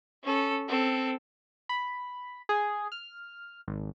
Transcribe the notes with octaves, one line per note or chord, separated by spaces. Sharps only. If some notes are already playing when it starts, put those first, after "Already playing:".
C#4 A4
C4 A4
B5
G#4
F6
G#1